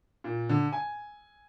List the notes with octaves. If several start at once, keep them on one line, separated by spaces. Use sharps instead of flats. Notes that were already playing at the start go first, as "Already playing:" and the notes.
A#2
D3
G#5